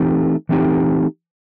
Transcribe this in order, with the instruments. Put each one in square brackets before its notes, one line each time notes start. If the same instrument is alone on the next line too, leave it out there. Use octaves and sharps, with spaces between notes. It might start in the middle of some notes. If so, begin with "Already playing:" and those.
Already playing: [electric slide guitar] E3 A3 C4 D#4 G4
E3 A3 C4 D#4 G4